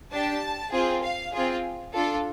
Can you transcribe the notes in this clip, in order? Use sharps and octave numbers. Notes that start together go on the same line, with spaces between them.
D4 G4 A5
C4 F4 G#4
F5
C4 F4 G#4
D4 F4 A4